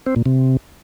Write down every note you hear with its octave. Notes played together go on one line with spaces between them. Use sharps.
C4
A#2
C3